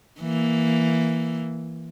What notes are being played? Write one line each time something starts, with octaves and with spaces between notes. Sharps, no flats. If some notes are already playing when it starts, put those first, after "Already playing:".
E3 A#3